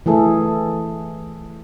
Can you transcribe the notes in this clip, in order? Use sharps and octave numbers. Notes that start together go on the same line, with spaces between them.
E3 A3 G#4 A4 E5